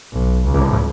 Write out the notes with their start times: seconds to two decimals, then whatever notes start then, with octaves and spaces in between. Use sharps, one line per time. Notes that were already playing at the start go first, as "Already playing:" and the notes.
0.12 B1
0.46 C#2